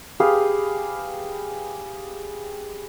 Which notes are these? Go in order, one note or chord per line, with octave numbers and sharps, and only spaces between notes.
G4 G#4 B4 F5